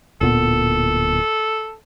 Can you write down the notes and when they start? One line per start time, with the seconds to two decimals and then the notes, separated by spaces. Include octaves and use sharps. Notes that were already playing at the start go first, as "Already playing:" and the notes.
0.21 D1 A#2 B3 A4